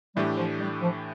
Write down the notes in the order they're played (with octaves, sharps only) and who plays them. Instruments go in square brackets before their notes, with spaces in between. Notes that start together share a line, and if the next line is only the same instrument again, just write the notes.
[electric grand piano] A2 E3 A3 D4 G4 [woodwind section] G3
[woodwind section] F3
G3
F3